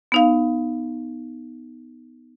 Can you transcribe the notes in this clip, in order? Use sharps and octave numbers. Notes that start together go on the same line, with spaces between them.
B3 D#4 F5